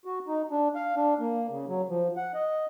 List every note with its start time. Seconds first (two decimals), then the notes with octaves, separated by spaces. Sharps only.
0.05 F#4
0.27 D#4
0.51 D4
0.75 F5
0.96 D4
1.19 A#3
1.50 C#3
1.68 F#3
1.89 F3
2.17 F#5
2.34 D#5